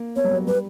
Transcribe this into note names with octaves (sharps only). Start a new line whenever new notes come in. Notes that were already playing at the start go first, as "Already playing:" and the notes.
Already playing: A#3
B3 C#5
G3
F#3
G3 B4